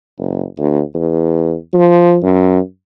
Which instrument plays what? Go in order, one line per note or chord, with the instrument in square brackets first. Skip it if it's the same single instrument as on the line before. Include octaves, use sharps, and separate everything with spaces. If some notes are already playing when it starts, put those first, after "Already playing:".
[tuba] F#1
D2
E2
F3
F#2